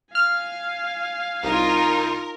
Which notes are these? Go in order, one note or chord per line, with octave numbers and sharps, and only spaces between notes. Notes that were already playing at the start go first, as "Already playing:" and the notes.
F5 G#5 F6
C2 D#4 F4 A#4